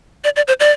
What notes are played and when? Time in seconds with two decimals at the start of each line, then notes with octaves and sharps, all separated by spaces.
0.24 D5
0.36 D5
0.48 C5
0.60 D5